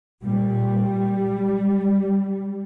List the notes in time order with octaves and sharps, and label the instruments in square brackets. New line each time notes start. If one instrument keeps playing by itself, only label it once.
[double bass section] A#2 G3